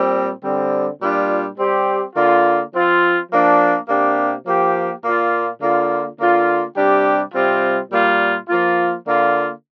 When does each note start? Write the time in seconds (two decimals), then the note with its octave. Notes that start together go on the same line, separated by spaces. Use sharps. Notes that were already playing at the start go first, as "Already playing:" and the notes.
Already playing: A#2 G3 C4
0.43 D3 G3 C4
1.01 A#2 G3 D4 F4
1.58 G3 C4 G4
2.16 D3 A#3 F4
2.74 F3 C4 F4
3.31 F3 A#3 D4
3.89 C3 A#3 D4 G4
4.45 F3 A#3 G4
5.04 A#2 A#3 F4
5.61 D3 A#3 F4
6.18 D3 A#3 F4
6.76 C3 G3 D4 G4
7.34 C3 G3 C4 F4
7.91 A#2 G3 A#3 F4
8.49 F3 A#3 F4
9.06 D3 A#3 F4